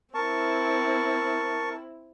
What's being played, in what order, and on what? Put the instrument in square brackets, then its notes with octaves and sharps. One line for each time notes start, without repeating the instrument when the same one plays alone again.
[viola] C4 E4 [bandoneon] A#4 A5 C#6